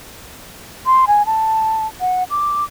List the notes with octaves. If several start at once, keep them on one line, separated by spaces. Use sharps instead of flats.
C6
G#5
A5
F#5
D6